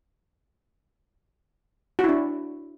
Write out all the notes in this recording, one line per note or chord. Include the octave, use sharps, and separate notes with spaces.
D4 E4 F#4